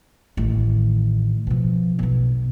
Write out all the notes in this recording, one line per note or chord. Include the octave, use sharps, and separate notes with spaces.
A1 D#3
B2 F3
B1 B2